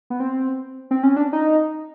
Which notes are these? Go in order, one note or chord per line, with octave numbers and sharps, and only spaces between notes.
B3
C4
C4
C#4
D4
D#4